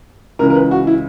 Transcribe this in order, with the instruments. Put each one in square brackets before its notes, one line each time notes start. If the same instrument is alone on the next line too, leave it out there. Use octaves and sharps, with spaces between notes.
[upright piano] C#2 C#3 E3 A#4
A#4
B4
F#4
E4